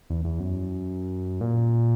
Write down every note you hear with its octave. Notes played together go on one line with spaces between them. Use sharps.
E2
E2
F#2
A#2